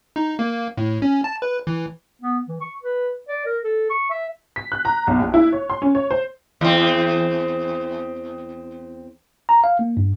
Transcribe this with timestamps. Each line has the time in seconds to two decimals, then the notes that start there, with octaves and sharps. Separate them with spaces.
0.16 D#4
0.39 A#3
0.77 A2
1.02 C#4
1.24 A5
1.42 B4
1.67 E3
2.22 B3
2.48 E3
2.61 C#6
2.83 B4
3.28 D5
3.46 A#4
3.64 A4
3.90 C#6
4.10 E5
4.56 B6
4.72 F#6
4.85 A#5
5.07 B1
5.20 A#1
5.34 E4
5.52 C#5
5.70 C6
5.82 C#4
5.95 C#5
6.11 C5
6.61 E2 C4
9.49 A#5
9.64 F5
9.79 A#3
9.97 G2